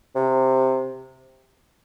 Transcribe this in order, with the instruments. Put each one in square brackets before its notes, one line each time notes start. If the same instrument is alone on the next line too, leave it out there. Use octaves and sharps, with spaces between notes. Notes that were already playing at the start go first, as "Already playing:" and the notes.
[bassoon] C3